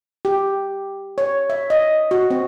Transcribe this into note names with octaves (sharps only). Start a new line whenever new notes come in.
G4
C#5
E5
D#5
F#4
C4